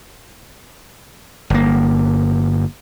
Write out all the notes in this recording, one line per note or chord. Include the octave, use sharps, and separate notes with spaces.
G1 A#3